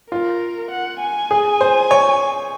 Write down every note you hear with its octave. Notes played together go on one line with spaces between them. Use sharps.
F4 A#4
F#5
G#5
G#4
C5
C#5